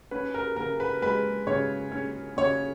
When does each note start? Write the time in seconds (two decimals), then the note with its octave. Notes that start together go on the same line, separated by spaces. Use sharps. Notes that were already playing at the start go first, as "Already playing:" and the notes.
0.11 C#4 B4
0.34 A#4
0.56 C#3 A#4
0.80 B4
1.02 G#3 B4
1.47 C#3 C#5
1.92 C#4
2.37 C#3 C#5